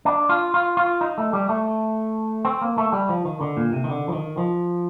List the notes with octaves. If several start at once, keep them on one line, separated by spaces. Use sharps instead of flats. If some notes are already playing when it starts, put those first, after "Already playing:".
D4
F4
F4
F4
D#4
A3
G3
A3
C4
A#3
A3
G3
F3
D#3
D3
A#2
C3
D#3
D3
F3
D#3
F3